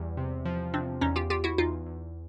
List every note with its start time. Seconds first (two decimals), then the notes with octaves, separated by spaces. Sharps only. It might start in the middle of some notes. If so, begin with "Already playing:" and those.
Already playing: E2 G3
0.17 C3
0.45 F3
0.73 C3 C4 D4
1.01 E2 C#4 D#4
1.16 F4 G4
1.30 E2 F4 G4
1.44 E4 F#4
1.58 E2 D#4 F4
1.86 E2